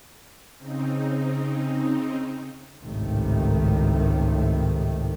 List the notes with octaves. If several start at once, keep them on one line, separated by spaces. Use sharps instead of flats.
C#3 C4 D#4
G#1 C#2 A2 C3 D#3 A3